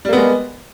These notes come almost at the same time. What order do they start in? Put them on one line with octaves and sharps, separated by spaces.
G3 A#3 B3 G#3